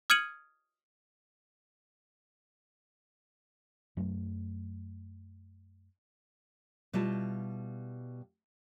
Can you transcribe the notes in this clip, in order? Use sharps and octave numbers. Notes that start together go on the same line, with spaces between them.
D#6 F6 G#6 C#7 D#7 F#7
F#2 F#3 A3
B2 G3 E4 F4 A5